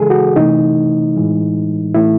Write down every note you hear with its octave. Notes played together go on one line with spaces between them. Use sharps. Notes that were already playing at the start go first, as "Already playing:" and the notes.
Already playing: C#3 E3 G#3 G#4 A4
F#4
C3 E3 A3 D#4
A2 E3 G#3
A2 E3 A3 E4